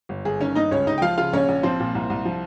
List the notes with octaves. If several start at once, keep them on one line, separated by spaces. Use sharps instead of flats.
G1
G1 G#4
D#3 C#4 C#5
G2 D#4 D#5
C#2 C#4 C#5
C#2 D#4 D#5
G5
F3 F4 F5
C#3 F4 F5
A#1 C#4 C#5
A#1
F3 C4 C5
A#2
C2
C2
F3